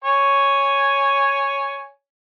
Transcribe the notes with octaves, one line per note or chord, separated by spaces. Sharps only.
C#5 G#5